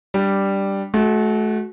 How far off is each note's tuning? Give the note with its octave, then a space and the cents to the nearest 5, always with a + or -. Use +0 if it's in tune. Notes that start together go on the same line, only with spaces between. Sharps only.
G3 +0 D4 +0
A3 -35 F#4 +0